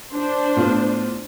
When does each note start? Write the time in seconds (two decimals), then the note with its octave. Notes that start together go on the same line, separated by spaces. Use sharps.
0.13 D4 C5
0.56 A2 B3 F4